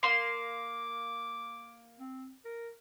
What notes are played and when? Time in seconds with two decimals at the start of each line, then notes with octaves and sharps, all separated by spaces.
0.03 A#3 C6 D6
1.99 C4
2.45 A#4